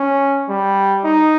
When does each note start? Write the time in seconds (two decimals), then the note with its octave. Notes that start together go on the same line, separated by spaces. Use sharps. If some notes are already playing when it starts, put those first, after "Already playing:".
Already playing: C#4
0.48 G3
1.04 D#4